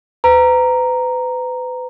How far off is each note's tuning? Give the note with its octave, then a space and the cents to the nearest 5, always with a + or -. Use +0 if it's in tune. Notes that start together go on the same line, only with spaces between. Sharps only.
B4 +35 A#5 +0